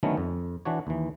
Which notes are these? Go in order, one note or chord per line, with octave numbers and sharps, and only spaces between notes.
D3 D#3 F#3 A3 B3 C#4
F2
E3 D4 F#4 C#5
D#2 E3